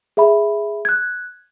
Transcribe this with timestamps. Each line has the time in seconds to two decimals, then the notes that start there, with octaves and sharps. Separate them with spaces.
0.17 G#4 E5 B5
0.85 F#6 G#6